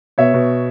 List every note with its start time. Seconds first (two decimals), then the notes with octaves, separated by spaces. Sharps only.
0.18 B2 C#5 E5
0.34 B2